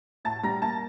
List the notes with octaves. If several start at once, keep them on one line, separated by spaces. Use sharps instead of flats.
A2 A5 A6
G3 A#5 A#6
A#3 A5 A6